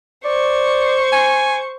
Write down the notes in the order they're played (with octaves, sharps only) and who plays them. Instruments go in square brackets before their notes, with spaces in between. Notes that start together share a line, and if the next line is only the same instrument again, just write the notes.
[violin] C5 C#6 [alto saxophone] D5
[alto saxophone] G#5